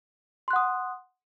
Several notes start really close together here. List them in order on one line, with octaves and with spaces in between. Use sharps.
C6 F#6 F#5 D#6